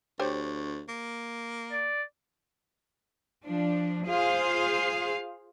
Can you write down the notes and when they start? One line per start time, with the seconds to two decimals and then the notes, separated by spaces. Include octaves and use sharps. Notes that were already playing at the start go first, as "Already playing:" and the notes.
0.20 D2 G4 C5 C#5
0.89 A#3
1.71 D5
3.45 F3 D4
4.06 F4 G#4 C5 F5